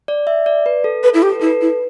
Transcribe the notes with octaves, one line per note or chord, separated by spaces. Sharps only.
D5
E5
D5
B4
A4
A4 B4
E4 A4
G4
B4
E4 A4
B4
E4